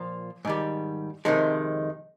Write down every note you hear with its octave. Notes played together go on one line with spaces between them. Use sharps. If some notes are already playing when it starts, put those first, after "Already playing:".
Already playing: A#2 F3 A#3 F4
G#2 D#3 G3
F2 C3 D#3 G#3